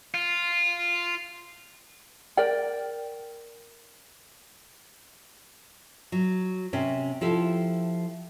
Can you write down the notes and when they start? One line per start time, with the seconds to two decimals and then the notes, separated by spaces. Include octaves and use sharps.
0.14 F4
2.37 A#4 D5 G5
6.12 F#3
6.73 C3 C#4
7.21 F3 E4 G4 A4